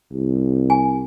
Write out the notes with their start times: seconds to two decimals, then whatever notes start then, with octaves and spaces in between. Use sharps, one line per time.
0.12 C2
0.70 G#5